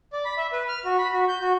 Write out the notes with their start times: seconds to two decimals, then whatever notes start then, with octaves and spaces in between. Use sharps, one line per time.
0.13 D5
0.25 B5
0.37 E5
0.53 B4
0.68 F6
0.85 F#4
0.98 B5
1.13 F#4
1.28 G6
1.40 F#4